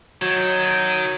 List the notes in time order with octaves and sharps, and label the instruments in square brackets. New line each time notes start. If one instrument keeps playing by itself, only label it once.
[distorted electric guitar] D#3 [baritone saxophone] F#3